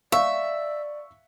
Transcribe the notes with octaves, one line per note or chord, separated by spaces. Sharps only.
C#5 D5 E5 F5 C#6 E6